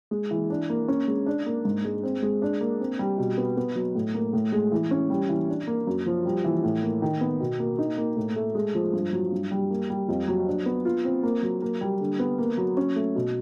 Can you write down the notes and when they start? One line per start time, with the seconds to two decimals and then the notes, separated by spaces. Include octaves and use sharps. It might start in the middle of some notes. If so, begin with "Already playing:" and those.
0.11 G#3
0.31 E3
0.50 D4
0.70 A#3
0.88 C#4
1.08 G#3
1.26 D4
1.46 A#3
1.65 G#2
1.84 G#3
2.03 C4
2.22 G#3
2.42 D4
2.61 A#3
2.80 C4
2.99 G3
3.18 B2
3.38 B3
3.57 B3
3.76 F#3
3.95 A2
4.14 A#3
4.33 A2
4.52 G#3
4.72 E3
4.91 C#4
5.10 G3
5.29 E3
5.49 D4
5.67 A#3
5.87 F#2
6.06 F3
6.25 G3
6.44 E3
6.63 A2
6.83 A#3
7.02 D#3
7.21 B3
7.40 B2
7.59 A#3
7.78 D#4
7.98 A#3
8.16 A2
8.36 A3
8.55 G#3
8.75 F3
8.93 G2
9.13 F#3
9.32 G2
9.51 G3
9.70 A#3
9.90 G3
10.08 F2
10.28 F#3
10.47 D4
10.66 B3
10.85 F4
11.04 C4
11.23 A#3
11.42 F#3
11.62 A#3
11.81 G3
12.00 D3
12.19 B3
12.38 A#3
12.57 F#3
12.77 C#4
12.96 A3
13.15 B2